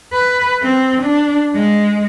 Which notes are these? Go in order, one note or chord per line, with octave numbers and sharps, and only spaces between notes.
B4
C4
D4
G#3